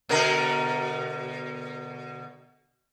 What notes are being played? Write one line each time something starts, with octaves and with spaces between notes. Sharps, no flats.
B2 D3 A#4